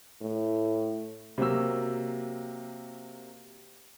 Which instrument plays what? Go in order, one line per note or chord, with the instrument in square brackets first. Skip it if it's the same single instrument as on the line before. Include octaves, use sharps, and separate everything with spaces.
[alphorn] A2
[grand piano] C3 F#3 A#3 E6